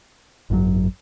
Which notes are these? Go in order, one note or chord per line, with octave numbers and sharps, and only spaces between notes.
G#1 F#2 C#3 F#3